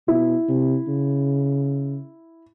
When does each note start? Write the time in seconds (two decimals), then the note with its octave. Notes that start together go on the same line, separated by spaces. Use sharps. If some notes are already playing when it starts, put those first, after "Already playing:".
0.08 B2 E4
0.48 C3
0.88 C#3